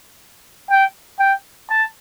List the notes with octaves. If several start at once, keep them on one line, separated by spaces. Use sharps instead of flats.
G5
G5
A5